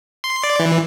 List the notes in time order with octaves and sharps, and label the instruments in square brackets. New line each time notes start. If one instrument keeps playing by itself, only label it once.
[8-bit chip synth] C6
D5
E3